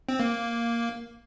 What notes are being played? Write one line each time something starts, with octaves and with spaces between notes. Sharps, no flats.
C4
A#3